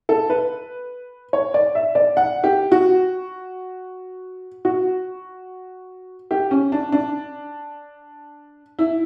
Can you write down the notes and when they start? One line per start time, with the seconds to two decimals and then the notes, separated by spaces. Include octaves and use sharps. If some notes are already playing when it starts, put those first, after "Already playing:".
0.09 A4
0.30 B4
1.33 C#5
1.54 D5
1.75 E5
1.95 D5
2.17 F#5
2.44 G4
2.72 F#4
4.65 F#4
6.31 G4
6.51 C#4
6.72 D4
6.92 D4
8.79 E4